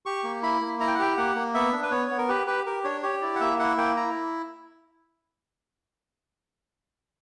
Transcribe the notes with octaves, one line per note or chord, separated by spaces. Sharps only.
G4 C#6
A#3
E4 B5
A#3
E4 A#5
G5
F#5
G4 G5
A#3 F#5
A#3
B3 E5
D4
B4
B3 C#5
B3
A#4
G4 B4
G4 B4
G4 A#4
D4 C#5
G4 C#5
E4 D5
F#5
A#3 E5
E4 F#5
A#3 G5
E4 A#5